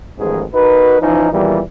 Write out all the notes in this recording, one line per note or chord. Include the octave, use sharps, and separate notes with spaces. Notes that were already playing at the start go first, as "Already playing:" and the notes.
A1 E2 G#2 D#3 F3 G#4
D#4 F#4 A#4 B4
E3 F3 C#4 D#4
E2 A#2 D#3 E3 G3